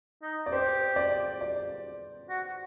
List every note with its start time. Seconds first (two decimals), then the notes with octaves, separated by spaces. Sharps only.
0.23 D#4
0.46 D5
0.52 G4 C5
0.96 D5
1.41 D5
2.29 F#4